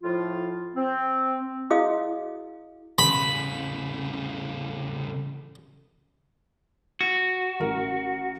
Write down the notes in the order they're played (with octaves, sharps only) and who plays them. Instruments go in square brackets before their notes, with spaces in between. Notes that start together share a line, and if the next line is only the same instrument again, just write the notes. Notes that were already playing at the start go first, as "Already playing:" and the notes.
[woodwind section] F2 A2 F3 F4
C4
[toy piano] E4 F#4 G#4 D#5 F5 D#6
[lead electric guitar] E2 C#3 [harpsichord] B5
[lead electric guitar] F#4
[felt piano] A1 A#4